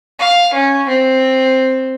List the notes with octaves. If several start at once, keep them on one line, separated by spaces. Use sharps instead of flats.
F5
C#4
C4